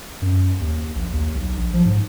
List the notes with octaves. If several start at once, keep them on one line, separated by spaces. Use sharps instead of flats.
F#2
D#2
A#1
D#2
B1
A#1
F3
G#2